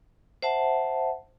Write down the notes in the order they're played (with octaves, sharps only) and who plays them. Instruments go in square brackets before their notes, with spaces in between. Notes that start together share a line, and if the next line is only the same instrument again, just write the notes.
[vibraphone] C5 E5 F#5 A5